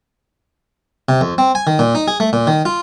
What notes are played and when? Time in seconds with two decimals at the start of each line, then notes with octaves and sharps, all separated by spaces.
1.09 C3
1.21 F2
1.38 C4
1.55 G#5
1.67 D#3
1.79 A#2
1.95 D#4
2.08 G#4
2.20 A3
2.33 A#2
2.47 D#3
2.65 F4